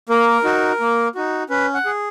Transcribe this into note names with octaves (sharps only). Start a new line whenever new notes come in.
A#3 A#4
D#4 F#4
A#3
D#4 F#4
C#4 B4
F#5
G#4